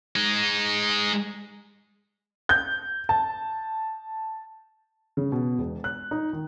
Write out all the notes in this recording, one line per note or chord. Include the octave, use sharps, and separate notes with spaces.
G#3 D#4
G6
A5
C#3
B2
E1
F#6
D#4
D#3